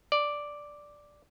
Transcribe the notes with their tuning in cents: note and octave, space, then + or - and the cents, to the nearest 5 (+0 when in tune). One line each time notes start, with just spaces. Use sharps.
D5 +0